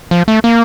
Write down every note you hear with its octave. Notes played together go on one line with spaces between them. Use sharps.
F3
A3
A#3